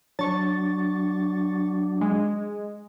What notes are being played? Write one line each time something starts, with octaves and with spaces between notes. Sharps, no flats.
F#3 D4 C#6 A6
G#3